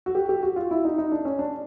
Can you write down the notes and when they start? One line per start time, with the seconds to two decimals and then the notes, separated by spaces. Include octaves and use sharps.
0.06 F#4
0.15 G4
0.29 G4
0.43 F#4
0.56 F4
0.71 E4
0.85 D#4
0.98 D#4
1.12 D4
1.25 C#4
1.39 D4